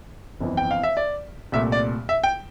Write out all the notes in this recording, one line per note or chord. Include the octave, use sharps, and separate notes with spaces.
G1 F2 E3
G5
F5
E5
D5
C2 A#2 A3 E5
D5
E5
G5